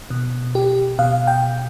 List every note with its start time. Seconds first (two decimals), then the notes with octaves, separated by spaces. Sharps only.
0.10 B2
0.55 G4
0.99 B2 F5
1.27 G5